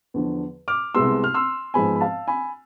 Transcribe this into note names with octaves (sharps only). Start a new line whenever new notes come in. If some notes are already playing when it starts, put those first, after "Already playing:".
E2 D3 F3
D6 F6
C2 C3 G#3 B3 C6 E6
F6
C6 E6
G#2 F3 G#3 B3 G#5 B5
B5
F5 A5
G#5 B5